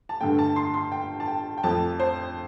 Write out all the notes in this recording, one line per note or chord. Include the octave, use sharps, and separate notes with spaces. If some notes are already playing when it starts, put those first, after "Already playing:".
A5
G2 D3 A3 G5
A5
C6
C6
G5
A5
G5
G5
F2 F3 A3 A5
C5